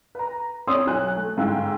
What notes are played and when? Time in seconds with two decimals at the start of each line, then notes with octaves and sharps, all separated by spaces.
0.15 B4 A#5
0.67 C4 D4 C#5 C6 D#6 E6
0.87 B1 F#3 G#5 F#6
1.17 A3
1.37 G1 G#2 F5 G5 E6